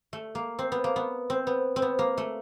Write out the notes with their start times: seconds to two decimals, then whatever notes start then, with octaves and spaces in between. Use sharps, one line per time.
0.13 A3
0.35 A#3
0.59 C4
0.72 B3
0.84 A#3
0.96 B3
1.30 C4
1.47 B3
1.76 C4
1.82 B3
1.99 A#3
2.17 A3